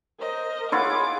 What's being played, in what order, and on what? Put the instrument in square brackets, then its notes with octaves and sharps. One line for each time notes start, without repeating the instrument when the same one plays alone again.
[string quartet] A#4 C5 D#5
[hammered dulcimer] E4 F4 F#5 [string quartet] G#4 D6